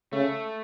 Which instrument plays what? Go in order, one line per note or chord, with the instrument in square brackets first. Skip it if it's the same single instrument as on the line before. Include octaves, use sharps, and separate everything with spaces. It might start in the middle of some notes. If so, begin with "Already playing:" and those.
[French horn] C#3 [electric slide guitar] A3